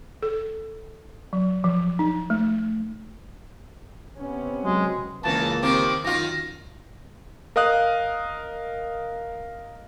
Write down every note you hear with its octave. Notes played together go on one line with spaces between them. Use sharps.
A4
F#3
F3
D#4
A3
C3 B3 C#4
F#3 G#3
C#2 A#2 E3 A#3 C#4 A5
D#3 G3 C4 D6
F#2 D#3 D#4 F4 A#6
A#4 D#5 F5 D#6 F#6